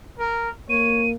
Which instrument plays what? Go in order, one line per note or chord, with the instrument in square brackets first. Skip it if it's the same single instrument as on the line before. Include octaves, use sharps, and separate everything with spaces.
[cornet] A#4
[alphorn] A#3 [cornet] C#5 [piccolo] D#7